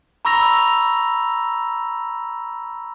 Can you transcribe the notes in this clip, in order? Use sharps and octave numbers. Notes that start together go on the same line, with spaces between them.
A#5 B5 C#6 E6 A#6 F7